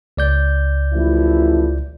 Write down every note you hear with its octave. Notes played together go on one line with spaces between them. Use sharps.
C#2 D5 G6
A1 F3 E4